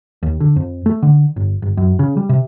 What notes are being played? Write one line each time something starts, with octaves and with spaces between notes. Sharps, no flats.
D#2
D3
F2
A3
D3
G1
G1
F#2
C#3
G3
C3